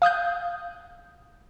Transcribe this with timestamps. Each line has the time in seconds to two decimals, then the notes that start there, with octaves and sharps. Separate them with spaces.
0.02 F5 D#6 F#6 G6